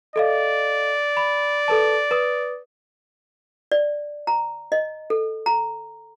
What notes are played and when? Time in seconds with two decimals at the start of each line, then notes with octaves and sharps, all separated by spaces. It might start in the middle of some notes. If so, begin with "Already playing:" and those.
0.16 A4 D5 D#5 F5
1.17 B5
1.68 A4 B4 A5
2.11 B4 D#6
3.72 D5
4.27 A#5
4.72 D#5
5.10 A4
5.46 A#5